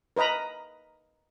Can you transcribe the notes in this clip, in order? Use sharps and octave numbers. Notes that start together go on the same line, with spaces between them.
A#4 B4 D#5 A#5 B5